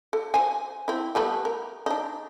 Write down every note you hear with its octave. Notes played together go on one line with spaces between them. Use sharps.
A4
C5 G#5
C4 E4
G3 A3 B3
A#4
D4 D#4